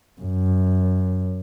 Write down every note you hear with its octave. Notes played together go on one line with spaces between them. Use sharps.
F#2